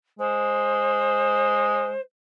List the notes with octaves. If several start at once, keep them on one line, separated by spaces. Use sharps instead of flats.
G#3 C5